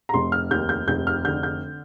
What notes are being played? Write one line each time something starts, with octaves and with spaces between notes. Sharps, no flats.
A#5
F1 C6
F6
D#2 G6
G6
F1 G6
F6
D3 G6
G6